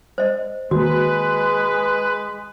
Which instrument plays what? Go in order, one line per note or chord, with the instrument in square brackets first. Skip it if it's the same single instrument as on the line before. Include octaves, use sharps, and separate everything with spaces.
[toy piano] C5 D#5
[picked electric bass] D#3 A#3 [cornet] G#3 [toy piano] F#4 [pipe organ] B4